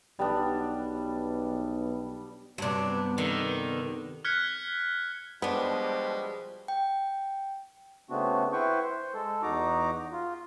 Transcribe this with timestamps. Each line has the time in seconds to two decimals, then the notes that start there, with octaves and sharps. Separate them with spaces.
0.19 B1 G3 B3 D4
2.58 G2 C3 F#3 B3 D4
3.18 D3 D#3
4.25 F6 F#6 G#6 B6 C#7
5.42 B2 F3 G3 G#3 B3 D4 C5
6.68 G5
8.10 C#3 A3 B3 C4 D4 F#4
8.53 E4 B4 C5 G5 C#6
8.82 C5
9.14 G#3 A4
9.43 E2 D#4 F#4 A#5 D6
10.13 F4